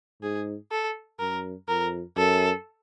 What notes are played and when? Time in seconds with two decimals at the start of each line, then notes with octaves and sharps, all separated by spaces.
0.22 G#2 G#4
0.72 A4
1.19 F#2 A#4
1.68 F2 A#4
2.17 F#2 A4